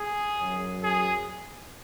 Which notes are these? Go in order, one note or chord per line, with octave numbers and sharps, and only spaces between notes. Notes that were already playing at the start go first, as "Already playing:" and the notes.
Already playing: G#4
F#2 F#3
G#4